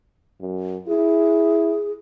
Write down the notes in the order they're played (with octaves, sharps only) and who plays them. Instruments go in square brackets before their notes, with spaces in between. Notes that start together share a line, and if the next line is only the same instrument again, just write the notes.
[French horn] F#2
[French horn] E4 [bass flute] G#4